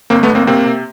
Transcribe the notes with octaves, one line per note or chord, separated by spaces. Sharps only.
G1 A#3 C4
A3 B3
G1
A#3 C4
C3 A#3 C4
C3